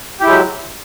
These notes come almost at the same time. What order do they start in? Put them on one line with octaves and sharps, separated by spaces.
G4 E4 G#3 F#3